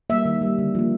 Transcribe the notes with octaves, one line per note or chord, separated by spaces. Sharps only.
G3 A#3 E5
D#3
G3 A#3
D3
F3 A#3